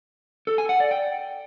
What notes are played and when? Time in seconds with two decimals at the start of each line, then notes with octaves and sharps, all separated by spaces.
0.47 A4
0.58 G#5
0.69 F#5
0.80 D5
0.91 G5